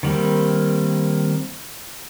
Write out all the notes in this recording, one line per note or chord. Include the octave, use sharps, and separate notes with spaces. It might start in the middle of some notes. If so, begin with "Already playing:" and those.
D#3 G3 A#3 C4